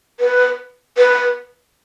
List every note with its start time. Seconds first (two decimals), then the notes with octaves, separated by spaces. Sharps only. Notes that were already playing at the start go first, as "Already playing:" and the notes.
0.20 B4
0.98 B4